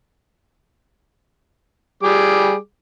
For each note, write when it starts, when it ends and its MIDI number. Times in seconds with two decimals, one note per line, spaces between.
2.03 2.55 55
2.03 2.55 68
2.03 2.55 86